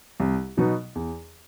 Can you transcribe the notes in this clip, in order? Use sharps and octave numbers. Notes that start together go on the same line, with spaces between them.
C2
B2 F#3 B3 D#4
E2